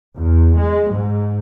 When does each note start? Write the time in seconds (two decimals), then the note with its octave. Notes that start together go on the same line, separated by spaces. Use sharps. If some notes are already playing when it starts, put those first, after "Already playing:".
0.15 E2
0.56 G#3
0.90 G#2